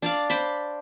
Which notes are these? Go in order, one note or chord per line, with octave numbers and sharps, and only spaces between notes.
D4 D5 F5
C5 B5 D6